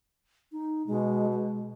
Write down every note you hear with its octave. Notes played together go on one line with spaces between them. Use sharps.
D#4
B2 G#3
G#3